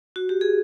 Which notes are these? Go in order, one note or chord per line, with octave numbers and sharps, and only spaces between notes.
F#4
G4
G#4